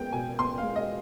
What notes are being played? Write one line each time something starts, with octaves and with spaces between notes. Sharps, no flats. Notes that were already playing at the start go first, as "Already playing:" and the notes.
Already playing: G#3 B3 G5
B2 G#5
B3 C6
F5
G#3
D#5